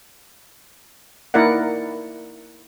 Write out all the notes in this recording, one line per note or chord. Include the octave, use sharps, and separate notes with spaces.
A#3 D#4 E4 A#4 D5 F#5